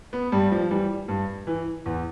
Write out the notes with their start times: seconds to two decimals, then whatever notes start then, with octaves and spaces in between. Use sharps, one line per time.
0.13 B3
0.32 G2 G3
0.52 F3
0.70 E3 G3
1.08 G2
1.47 E3
1.86 E2